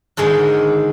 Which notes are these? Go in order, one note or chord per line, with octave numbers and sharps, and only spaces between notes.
G#2 D3 D#3 G#3